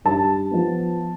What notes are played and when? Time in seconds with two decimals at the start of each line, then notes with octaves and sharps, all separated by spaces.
0.05 G2 A5
0.51 F3 B3